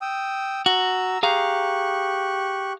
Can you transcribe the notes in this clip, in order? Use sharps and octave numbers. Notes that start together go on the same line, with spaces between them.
G5 D#6 E6
F#4 A#5 E6
G4 G#4 F5 A#5 C#6 F#6